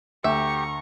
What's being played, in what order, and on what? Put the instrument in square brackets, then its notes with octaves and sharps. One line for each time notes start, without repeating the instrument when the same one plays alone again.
[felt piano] D2 [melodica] G4 [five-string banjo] E5 [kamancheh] A#5 C#6